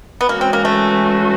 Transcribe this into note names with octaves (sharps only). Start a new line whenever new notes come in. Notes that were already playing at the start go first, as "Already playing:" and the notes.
B3
E3 G#3 A#3 C#4 F#4
C4
A#3
A3